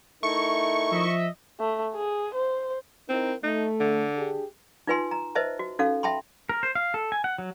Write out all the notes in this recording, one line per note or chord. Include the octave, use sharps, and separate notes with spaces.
A3 D#4 E4 A#4 C#6
F3 D#5 E5
A3
G#4
C5
C4 D#4 E4 A#4
A3 D#4
D3
D4 G4 G#4
D#4 F4 B4 G#5 C6
A#5
B4 C5 D#5 E5 A5
F#4
C#4 D#4 F#4 A4 F5
E5 G5 A5 B5 C6
A#4
C5
F5
A4
G#5
F#5
F#3